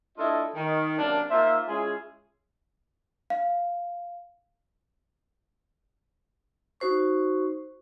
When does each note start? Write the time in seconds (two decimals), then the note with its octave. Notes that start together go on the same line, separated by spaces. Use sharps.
0.17 A3 D4 E4 F4 A4 D#5
0.55 D#3
0.98 F#2 C3 A#3 D4 A5
1.30 A#3 D#4 F4 C5 E5
1.67 G#3 C#4 E4 F4 G#4
3.30 F5
6.80 D#4 F#4 C5 C#6